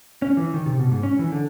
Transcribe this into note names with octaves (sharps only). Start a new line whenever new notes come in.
C#4
E3
D#3
C3
B2
G#2
C#4
E3
D3